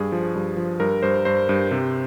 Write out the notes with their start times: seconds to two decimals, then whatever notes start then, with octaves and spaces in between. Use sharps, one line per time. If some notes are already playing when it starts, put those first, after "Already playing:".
Already playing: G2 G#4
0.12 F3
0.35 G2
0.57 F3
0.80 G2 A#4
1.03 G2 C5
1.25 G2 C5
1.49 G2
1.71 C3